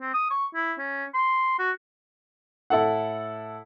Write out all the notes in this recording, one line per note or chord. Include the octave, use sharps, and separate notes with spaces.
C4
D#6
C#6
E4
C#4
C6
F#4
A2 E4 A4 F#5